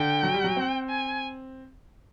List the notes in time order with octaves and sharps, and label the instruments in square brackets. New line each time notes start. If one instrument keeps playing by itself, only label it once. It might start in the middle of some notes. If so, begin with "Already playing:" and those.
Already playing: [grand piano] D3 [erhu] G5
[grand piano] F#3
G3
F#3
C4
[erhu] G#5